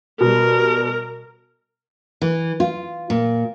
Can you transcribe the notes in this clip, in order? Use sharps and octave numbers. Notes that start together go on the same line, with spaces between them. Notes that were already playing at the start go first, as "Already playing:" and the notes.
B2 G3 A#4
E3
F4
A#2